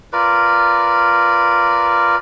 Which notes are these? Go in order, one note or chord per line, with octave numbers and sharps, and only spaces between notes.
F4 A#4 B4 D5